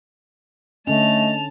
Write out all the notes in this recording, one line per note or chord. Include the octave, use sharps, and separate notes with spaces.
D3 A3 C#4 D#5 A5 F7